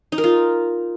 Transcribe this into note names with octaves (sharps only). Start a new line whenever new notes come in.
D#4
A#4
F4